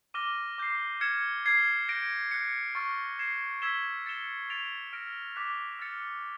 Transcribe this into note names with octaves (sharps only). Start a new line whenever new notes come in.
D6 F6 A#6 D#7 G7
D6 G6 C7
F6 G#6 C#7 E7
F6 G#6 C7
G6 A#6 D7
F#6 A#6 C#7
C#6 F6 A6
G#6 C7 E7
E6 G#6 B6 E7 G7
A6 C#7 E7 G7
A6 D7 F7
F6 A#6 D7
D6 F#6 B6
F6 A6 C#7